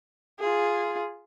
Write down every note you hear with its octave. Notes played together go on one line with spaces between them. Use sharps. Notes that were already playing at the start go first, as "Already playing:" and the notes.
F4 G#4